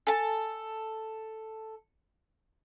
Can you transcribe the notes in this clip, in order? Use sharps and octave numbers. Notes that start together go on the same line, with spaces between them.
A4 G#5 A5